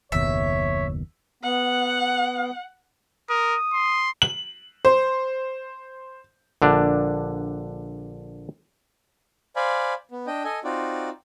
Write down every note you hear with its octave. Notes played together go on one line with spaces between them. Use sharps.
F#1 D#2 B2 C#5 E5
B3 F#5
A#4 D#6
C6
F#7
C5
A#1 D3 D4
C5 D5 F5 G#5 B5
B3
D4 D#5 G5
A4 D#5 G#5
C4 D#4 F4 F#4 D5